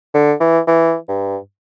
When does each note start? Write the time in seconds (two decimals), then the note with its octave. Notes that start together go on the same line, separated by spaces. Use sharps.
0.14 D3
0.40 E3
0.67 E3
1.08 G2